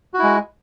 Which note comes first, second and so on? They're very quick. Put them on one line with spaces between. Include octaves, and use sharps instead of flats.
F#4 E4 G#3